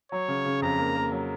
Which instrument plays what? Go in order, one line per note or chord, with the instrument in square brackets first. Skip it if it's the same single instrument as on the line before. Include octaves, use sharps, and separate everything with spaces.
[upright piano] F#3 [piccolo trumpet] C#5
[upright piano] C#3
C#3
[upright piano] F2 [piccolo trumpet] A#5
[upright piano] A#3
A#3
F#3